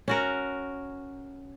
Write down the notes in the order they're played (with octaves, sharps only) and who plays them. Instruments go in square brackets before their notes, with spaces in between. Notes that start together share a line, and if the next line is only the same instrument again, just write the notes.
[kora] C#4 F#4 A#4